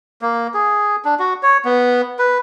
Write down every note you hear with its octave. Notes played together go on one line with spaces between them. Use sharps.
A#3
G#4
D4
F#4
C#5
B3
B4